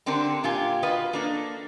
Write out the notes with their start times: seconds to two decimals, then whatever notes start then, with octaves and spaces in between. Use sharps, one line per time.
0.06 D3 C4 D4 G4 A#4
0.44 A#2 F4 G4 G#5
0.83 F4 F#4 B4 D#5
1.13 A#3 D4 A4